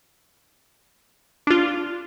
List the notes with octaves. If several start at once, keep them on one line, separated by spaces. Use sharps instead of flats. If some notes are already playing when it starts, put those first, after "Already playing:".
D4 F4